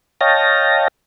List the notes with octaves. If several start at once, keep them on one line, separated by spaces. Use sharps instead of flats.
C#5 D#5 F5 G5 A5 A#6